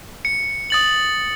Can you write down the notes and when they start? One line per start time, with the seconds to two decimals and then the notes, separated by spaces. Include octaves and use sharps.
0.25 C#7
0.70 D#6 A6 F#7